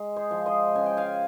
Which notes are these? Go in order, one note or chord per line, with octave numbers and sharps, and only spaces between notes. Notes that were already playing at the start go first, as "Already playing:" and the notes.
Already playing: G#3
G#4 C5
F3
C5 D#5
C#3 G#5
G5
F5 G#5